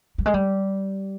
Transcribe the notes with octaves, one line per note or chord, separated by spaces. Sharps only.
G3
G#3
G3